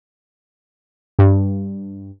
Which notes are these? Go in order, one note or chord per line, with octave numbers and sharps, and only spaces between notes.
G2